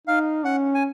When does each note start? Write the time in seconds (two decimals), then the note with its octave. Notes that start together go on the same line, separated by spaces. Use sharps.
0.07 D#4 F5
0.45 C#4 F#5
0.75 G#5